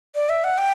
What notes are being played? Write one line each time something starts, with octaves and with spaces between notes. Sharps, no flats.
D5
E5
F#5
G5